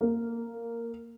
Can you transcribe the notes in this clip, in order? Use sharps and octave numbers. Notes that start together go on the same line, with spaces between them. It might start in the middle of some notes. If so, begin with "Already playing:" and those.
A#3